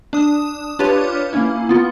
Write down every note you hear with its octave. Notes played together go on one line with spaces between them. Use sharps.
D4 D#6
D4 F4 G4 B4 C#5
A#3 C#4 E4
B3 F4